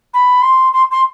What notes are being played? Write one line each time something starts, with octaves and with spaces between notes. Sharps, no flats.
B5
C6
C6
C6